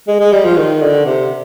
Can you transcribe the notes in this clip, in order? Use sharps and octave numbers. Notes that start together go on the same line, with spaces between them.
G#3
G#3
G3
F3
D#3
D3
C3